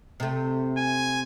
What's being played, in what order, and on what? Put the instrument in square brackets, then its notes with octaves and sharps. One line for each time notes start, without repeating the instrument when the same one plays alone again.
[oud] C3 A3
[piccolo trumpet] G#5